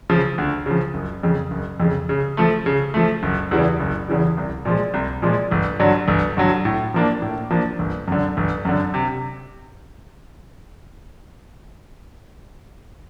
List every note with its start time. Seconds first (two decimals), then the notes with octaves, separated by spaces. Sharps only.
0.10 C#3 F3
0.38 D2
0.66 C#3 F3
0.94 F#1
1.23 F2 C#3
1.51 F#1
1.80 F2 C#3
2.09 C#3
2.37 F3 A3
2.66 C#3
2.94 F3 A3
3.23 F#1
3.51 E2 C#3 E3 G3
3.80 F#1
4.08 E2 C#3 E3 G3
4.37 C2
4.65 A#2 F3 G#3
4.94 C2
5.22 A#2 F3 G#3
5.51 G1
5.80 G2 D3 F#3
6.08 G1
6.37 G2 D3 F#3
6.65 A2
6.94 F3 A#3 D4
7.22 A2
7.50 F3 A#3 D4
7.79 G1
8.08 F#2 D3
8.37 G1
8.65 F#2 D3
8.94 C3